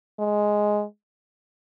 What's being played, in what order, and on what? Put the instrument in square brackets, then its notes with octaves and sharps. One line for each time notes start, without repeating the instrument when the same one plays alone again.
[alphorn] G#3